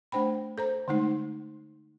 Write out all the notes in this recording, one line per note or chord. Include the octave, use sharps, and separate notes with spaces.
A3 D4 C5 G5 B5
A4 C5 A#5
D3 G#3 A3 D#4